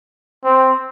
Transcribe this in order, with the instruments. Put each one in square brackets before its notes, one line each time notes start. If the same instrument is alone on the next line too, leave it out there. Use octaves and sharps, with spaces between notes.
[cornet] C4